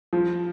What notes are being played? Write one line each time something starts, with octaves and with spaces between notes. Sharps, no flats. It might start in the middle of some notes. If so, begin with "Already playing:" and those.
F3